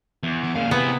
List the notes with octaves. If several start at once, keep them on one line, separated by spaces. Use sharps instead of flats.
E2
E3
A#2 C#3 F5
C3 B3 E4 G#4